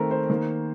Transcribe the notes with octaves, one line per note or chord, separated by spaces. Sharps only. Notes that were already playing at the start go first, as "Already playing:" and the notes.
Already playing: D#3 A3 C4 A#4
C5
D#3 A#3